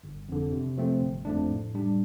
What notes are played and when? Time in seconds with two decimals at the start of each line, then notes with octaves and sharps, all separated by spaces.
0.04 G1
0.29 F2 D3
0.52 C3
0.77 F3 A3 C4
1.02 G1
1.25 F2 F3 A3 D4
1.49 A2
1.75 G3 D4